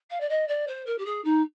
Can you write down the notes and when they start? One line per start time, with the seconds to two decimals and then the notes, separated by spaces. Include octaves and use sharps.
0.10 F5
0.20 D5
0.29 D#5
0.48 D5
0.67 C5
0.86 A#4
0.98 G4
1.05 G#4
1.24 D#4